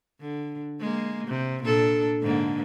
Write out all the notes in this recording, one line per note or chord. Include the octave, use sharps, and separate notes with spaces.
D3
G#3 A#3
C3
A#2 D4 A4
G#2 D3 A#3